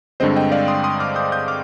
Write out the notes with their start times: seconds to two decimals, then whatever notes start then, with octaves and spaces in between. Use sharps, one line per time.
0.20 G2 D3 G#3 C4 C5 D#5
0.36 D#5 G5
0.52 D5 F5
0.68 C6 D#6
0.84 C6 D#6
1.00 D6 F6
1.16 D#6 G6
1.32 D#6 G6
1.48 D6 F6